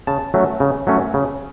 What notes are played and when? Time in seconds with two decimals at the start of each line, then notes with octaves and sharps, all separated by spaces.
0.07 C#3 A5
0.34 F#3 A3 C#4
0.60 C#3
0.87 F#3 A3 C#4
1.14 C#3